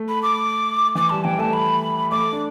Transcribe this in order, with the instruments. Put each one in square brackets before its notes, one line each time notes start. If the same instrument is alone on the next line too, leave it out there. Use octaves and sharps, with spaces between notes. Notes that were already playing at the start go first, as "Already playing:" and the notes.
Already playing: [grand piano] A3
[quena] B5
D6
[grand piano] E3 [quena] D6
[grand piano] G3 [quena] A5
[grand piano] E3 [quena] G5
[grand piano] A3 [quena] A5
[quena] B5
[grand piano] A3 [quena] D6
[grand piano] D4